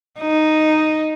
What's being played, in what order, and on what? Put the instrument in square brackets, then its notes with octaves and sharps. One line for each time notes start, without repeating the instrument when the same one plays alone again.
[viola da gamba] D#4